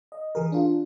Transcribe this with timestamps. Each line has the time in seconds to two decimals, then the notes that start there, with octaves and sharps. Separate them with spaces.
0.12 D#5
0.35 E3 G#4 A#4
0.52 D4 F4